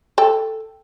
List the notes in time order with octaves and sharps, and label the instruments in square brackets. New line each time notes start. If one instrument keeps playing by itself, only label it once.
[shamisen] A4 G5